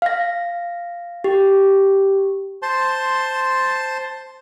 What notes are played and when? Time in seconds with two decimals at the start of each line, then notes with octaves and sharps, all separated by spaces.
0.02 F5 A#6
1.24 G4
2.62 C5 A5 C6